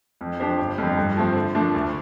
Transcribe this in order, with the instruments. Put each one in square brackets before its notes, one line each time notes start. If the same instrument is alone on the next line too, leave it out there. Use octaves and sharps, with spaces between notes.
[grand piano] F2
F3 D4 G4 C5
G1
F2 D3 G3
G2
F3 A3 C4
D3
F3 A3 D4
D2